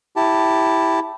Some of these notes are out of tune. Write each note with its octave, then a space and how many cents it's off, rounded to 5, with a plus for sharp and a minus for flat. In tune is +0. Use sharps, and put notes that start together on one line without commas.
E4 +0 G4 +0 A5 +5